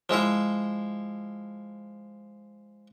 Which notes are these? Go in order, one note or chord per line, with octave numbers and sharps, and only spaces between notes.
F3 G#3 E4 F4